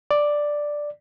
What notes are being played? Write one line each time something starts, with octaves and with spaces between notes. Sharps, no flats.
D5